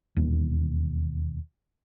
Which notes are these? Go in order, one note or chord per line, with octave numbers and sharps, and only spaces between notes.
E1 D#2